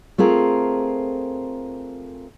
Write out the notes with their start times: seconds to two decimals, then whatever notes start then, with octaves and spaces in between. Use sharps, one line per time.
0.18 A3 C4 F4 G#4 A#4